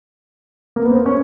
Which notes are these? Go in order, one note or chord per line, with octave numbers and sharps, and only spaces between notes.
A#3
B3
C4
C#4